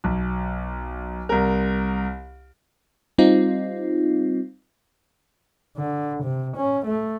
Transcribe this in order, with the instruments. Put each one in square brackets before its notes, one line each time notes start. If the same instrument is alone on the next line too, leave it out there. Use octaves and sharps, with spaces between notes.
[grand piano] B1
C2 A#4
[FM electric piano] G3 C4 D#4 F4
[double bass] D3
C3
C#4
A3